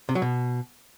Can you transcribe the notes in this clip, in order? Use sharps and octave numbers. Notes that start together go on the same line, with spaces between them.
C3
F#3
B2